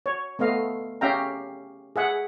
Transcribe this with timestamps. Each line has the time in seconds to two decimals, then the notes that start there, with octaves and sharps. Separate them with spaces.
0.06 C#5
0.39 A3 B3 D#5 F5
1.01 C#4 G4 E5 F5 G5 A#5
1.96 G#4 E5 F#5